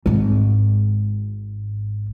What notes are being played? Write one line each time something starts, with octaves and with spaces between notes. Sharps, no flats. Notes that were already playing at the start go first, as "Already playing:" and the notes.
G#1 G#2